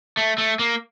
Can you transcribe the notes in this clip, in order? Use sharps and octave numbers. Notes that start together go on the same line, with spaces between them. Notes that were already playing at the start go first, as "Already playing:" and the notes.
A3
A3
A#3